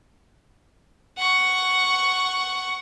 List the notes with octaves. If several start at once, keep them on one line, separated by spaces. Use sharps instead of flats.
F#5 C#6